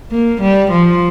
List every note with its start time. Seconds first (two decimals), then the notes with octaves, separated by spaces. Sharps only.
0.11 A#3
0.41 G3
0.71 F3